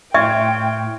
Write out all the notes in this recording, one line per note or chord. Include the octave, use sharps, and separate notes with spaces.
A2 E5 G5 C6 C#6 F6 G#6